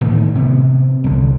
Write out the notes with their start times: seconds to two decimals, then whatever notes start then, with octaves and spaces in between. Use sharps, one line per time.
0.01 A2 D#3 E3 A3
0.35 C3 B3
1.04 C2 D3